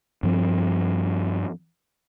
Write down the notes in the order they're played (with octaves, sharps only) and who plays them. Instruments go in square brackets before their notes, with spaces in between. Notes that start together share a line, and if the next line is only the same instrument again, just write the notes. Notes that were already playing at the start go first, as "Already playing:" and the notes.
[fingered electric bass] G2 F3 C4